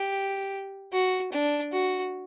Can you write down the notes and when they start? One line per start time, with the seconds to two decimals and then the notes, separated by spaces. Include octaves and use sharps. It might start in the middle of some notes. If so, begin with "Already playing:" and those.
Already playing: G4
0.92 F#4
1.32 D4
1.73 F#4